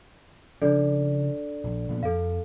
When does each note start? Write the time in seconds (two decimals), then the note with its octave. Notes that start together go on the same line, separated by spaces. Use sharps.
0.62 C#3 F3 D4 A4 D5
1.64 A#1
1.89 A#2 F3 B3
2.03 F2 A4 F5